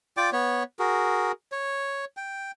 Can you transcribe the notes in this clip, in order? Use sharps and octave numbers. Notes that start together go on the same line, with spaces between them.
F4 D5 G5 D6
B3 C#5
F#4 G#4 A#4
C#5
G5